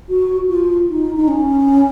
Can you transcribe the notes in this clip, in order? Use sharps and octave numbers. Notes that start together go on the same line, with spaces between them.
F#4
F4
D#4
D#4
C#4